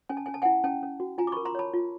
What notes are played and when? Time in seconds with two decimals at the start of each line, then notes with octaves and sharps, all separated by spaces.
0.09 C#4 G#5
0.17 A5
0.26 C#4 G#5
0.34 A5
0.42 F#5 G#5
0.45 E4
0.64 C#4 G5 A5
0.83 C#4
1.00 F#4
1.18 F4 G#5 A#5
1.27 D6
1.32 B5 C#6
1.37 A#4
1.45 A#5 C6
1.55 C#5 A5 B5
1.73 F4